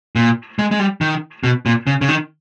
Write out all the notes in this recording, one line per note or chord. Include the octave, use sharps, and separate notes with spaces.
A#2
G#3
G#3
G3
D#3
B2
A#2
C#3
C#3
D#3